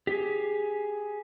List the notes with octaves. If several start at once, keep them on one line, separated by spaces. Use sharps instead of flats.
G4 G#4